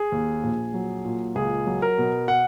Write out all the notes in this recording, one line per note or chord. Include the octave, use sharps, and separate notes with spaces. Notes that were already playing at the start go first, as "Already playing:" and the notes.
Already playing: G#4
D#2
A#1
F#3
A#2
C#2 G#4
F#3
A#4
B2
F#5